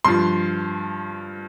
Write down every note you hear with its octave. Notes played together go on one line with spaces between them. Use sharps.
G2 F3 C6